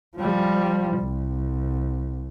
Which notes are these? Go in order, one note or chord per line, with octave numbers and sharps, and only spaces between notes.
F3 G3
C2